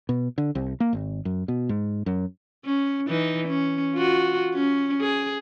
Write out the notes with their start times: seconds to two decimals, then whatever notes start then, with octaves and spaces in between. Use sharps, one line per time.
0.09 B2
0.38 D3
0.55 C2
0.80 A#3
0.93 G#1
1.25 F#2
1.48 B2
1.69 G#2
2.06 F#2
2.65 C#4
3.08 E3 D#4
3.48 C#4
3.95 F4 F#4
4.54 C#4
5.01 G#4